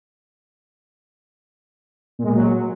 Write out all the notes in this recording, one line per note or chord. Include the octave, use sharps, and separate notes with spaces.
A#2
G#3
A#2
F#3